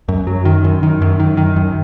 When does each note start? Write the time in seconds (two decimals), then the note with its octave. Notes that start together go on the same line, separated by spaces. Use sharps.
0.08 F#2
0.27 F#3
0.45 D#3
0.64 F#2
0.83 D#3
1.02 F#2
1.20 D#3
1.37 D#3
1.56 F#2